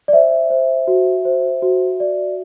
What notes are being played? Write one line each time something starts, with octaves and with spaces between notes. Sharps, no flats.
D5
C5 E5
C5
F#4
C5
F#4
D5